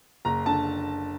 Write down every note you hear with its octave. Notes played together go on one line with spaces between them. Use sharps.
F#1 A#5
D3 A5